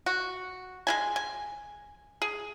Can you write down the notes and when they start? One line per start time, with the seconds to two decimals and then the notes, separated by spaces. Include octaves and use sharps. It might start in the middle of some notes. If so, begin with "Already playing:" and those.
0.06 F#4
0.87 G#3 E4 G#5
1.16 G#5
2.22 G#4